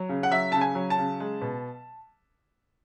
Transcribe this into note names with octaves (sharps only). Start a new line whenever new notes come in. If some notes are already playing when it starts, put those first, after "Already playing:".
Already playing: F#3
C#3
F#5
F#3 E5
C#3 A5
G#5
F#3
A5
C#3
G#3
B2